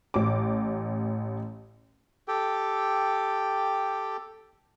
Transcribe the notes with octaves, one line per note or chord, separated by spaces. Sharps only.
A1 D6
G4 A4 G5